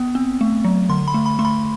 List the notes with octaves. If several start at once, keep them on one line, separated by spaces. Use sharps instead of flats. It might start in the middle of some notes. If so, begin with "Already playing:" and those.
Already playing: B3
C4
A3
F#3
D3 C6
B5
A3
B5
A3 C6
B5